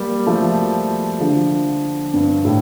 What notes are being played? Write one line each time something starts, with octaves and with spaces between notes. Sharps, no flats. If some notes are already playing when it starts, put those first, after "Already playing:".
Already playing: G3 A#3
F3 A3
D3 F3
G2
A2